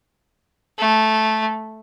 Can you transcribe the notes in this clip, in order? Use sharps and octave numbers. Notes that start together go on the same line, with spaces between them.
A3